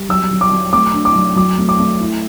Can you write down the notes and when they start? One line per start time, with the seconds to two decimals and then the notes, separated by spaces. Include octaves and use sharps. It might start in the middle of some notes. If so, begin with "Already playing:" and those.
Already playing: G3
0.09 F#3 E6
0.31 F#3
0.41 D6
0.51 F#3
0.73 A3 D6
0.94 D4
1.05 D6
1.16 F#3
1.36 F#3 D6
1.58 A3
1.69 D6
1.79 A3
2.01 E4